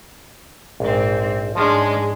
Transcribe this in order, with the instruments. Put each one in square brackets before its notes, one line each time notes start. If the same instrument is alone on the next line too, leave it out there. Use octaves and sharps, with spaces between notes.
[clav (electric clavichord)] A#1 [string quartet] G#2 C4
[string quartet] G#2 G#3 D4 [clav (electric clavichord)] F3 C#4 [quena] G#4